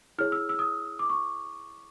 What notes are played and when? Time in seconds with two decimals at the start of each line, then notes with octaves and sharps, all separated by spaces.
0.18 E4 G#4 C#5 F6
0.32 E6
0.49 E6
0.59 D#6
0.99 D6
1.10 C#6